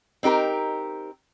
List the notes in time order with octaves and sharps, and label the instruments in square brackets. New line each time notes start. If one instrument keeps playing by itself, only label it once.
[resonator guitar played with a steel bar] C4 D#4 G4 A#4